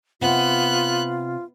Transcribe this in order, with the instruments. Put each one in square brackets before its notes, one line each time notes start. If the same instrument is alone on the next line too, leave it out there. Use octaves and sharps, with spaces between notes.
[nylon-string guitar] C3 F#5 [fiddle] B3 F#6 [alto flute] F4